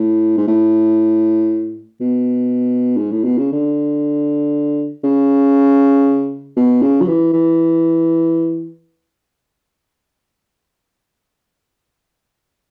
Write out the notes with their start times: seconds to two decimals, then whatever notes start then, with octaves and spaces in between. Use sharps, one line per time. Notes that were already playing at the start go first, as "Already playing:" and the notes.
Already playing: A2
0.37 G#2
0.48 A2
2.00 B2
2.97 G#2
3.11 A2
3.24 B2
3.38 C#3
3.52 D3
5.04 C#3
6.56 B2
6.82 C#3
7.02 F#3
7.07 E3
7.33 E3